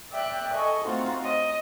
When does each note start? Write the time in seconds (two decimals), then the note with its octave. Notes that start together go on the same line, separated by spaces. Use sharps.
0.10 D5 E5 G5 F#6
0.54 A4 D#5 G#5 C#6
0.83 A3 C4 D#4 F4 F#4
1.23 D#5